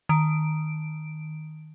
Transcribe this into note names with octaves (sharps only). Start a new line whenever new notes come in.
D#3 D7